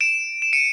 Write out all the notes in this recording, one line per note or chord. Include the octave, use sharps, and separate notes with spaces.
D7 E7
E7
C#7 D#7